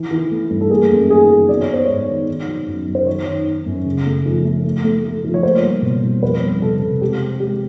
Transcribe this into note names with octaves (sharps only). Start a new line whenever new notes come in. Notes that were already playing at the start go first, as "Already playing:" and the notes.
Already playing: E3
E3
A3
G2
A4
A#3 G#4
F#2
D#3 G#4
F#3
B3 D5
C#5
B3 C5
G#2 C#5
D#3
D#3
F#3
F#2
F#2
C5
D#3 C#5
D#3
D#3
F#2
C#3
A3
F3
A3
A3
A3
A3
F3
C#5
A#3 C5
G3
B2
G3
F2 B4
G3
C3 A4
C3
G#3 G4
C4
G#3 G4